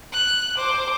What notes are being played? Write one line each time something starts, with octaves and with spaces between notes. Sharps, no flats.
F#6
C5 D6